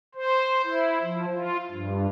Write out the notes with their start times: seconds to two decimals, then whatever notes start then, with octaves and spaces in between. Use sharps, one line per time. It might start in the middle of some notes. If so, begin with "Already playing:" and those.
0.15 C5
0.64 E4
1.02 F3
1.33 F4
1.71 G2